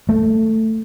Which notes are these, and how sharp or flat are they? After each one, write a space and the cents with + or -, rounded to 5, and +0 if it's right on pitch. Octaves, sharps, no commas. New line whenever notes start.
A3 +10